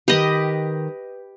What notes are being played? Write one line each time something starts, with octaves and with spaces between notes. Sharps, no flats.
D#3 G4 B4 D#5 G5